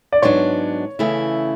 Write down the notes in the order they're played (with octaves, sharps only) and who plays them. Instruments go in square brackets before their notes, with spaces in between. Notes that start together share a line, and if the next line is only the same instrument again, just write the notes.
[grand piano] D5
[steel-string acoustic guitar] G#2 F#3 B3 D4 [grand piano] C#5
[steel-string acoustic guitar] C#3 E3 A3 E4